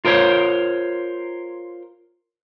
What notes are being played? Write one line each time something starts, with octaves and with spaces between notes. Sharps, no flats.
F4 A#4 C5 C#5